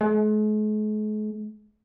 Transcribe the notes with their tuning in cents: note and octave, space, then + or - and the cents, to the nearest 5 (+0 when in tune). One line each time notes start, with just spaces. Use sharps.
G#3 +45